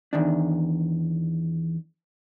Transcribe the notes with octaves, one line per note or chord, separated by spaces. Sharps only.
E2 D#3 D4